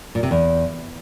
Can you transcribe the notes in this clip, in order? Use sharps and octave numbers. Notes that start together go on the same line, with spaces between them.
A#2
C3
E2